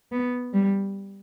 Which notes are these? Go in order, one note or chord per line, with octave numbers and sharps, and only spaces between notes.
B3
G3